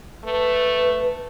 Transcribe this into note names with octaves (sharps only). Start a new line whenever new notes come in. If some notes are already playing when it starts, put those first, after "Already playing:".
A3 B4